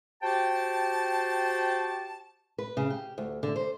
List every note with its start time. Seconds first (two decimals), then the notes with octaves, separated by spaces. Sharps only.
0.23 F#4 G4 C5 G5 A5
2.58 B4
2.77 C#3
2.90 G4
3.18 D2
3.43 D3
3.56 C5